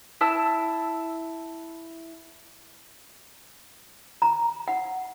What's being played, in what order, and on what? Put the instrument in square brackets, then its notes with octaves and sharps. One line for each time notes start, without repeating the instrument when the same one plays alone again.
[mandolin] E4 A5 E6
[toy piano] A#5
F#5